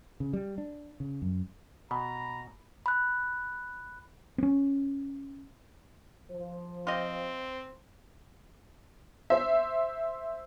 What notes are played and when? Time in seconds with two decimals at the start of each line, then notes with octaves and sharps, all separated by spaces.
0.20 C#3
0.33 G3
0.58 D4
1.00 C#3
1.22 F#2
1.91 B2 A#5 B5
2.86 B5 F#6
4.38 C4 C#4
6.32 F3 C5
6.87 C4 F4 G4 D#5
9.30 C5 E5